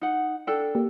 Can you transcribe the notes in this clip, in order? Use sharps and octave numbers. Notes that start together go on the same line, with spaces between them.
D#4 F#5
D4 A4 G5
A#3 G4